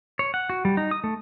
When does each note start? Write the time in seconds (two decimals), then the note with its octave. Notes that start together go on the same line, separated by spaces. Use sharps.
0.19 C#5
0.34 F#5
0.50 F#4
0.65 G3
0.77 D#4
0.91 D#6
1.04 A3